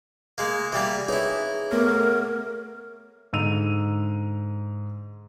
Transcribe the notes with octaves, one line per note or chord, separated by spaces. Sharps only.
G#3 A#3
E3 G3 A#3
D#4 E4 G#4 B4 C#5
A3 B3 A#4 C#5
G#2 D3 E6 D#7 F7